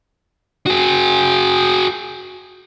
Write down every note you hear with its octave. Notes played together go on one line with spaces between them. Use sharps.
F#4 G#4